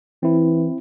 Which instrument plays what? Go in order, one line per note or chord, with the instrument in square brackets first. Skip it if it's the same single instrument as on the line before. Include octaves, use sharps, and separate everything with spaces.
[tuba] E3 [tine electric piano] C4 E4